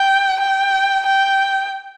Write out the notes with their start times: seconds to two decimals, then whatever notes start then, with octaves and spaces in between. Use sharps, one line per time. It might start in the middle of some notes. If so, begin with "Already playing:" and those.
Already playing: G5
0.40 G5
1.06 G5